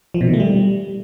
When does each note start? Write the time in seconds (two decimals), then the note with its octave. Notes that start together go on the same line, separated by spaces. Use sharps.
0.14 F3
0.21 B2
0.27 D#3
0.34 A3
0.40 G3